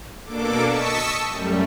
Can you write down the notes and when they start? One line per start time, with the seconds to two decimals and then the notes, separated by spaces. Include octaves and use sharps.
0.24 B2 A#3 D4 A4 D6
0.64 D#5 A5 C#6 E6 B6 C#7
1.28 F#2 G3 A3